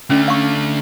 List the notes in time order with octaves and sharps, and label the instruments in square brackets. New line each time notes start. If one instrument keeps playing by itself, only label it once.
[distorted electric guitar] D3 A3 [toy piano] C#4
[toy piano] F5 C#6